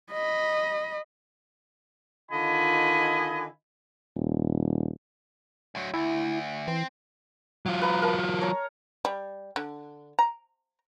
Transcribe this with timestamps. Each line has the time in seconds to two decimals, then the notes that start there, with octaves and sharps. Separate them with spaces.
0.12 D#5 B5
2.31 D3 D#3 F4 D#5 G#5 B5
4.16 D#1
5.75 D2 F#3
5.94 D2 E4
6.68 E3 C4
7.66 F#3 F4
7.82 B4 A#5
8.02 A#4 A5
8.41 C#5 A#5
9.05 G3
9.56 D3
10.19 A#5